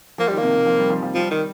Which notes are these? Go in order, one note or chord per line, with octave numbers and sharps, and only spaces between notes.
F3 A#3
D#3 G3
A#3
C3
C3
F3
G3
F3
F3
F3 G3
D#3